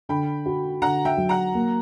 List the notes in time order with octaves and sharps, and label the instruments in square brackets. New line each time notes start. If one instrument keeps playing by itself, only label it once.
[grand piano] D3 [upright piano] G5 B5
[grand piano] F#4
[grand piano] D3 [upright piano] F#5 A#5
[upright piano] E5 G5
[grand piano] F#3
[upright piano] F#5 A#5
[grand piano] A#3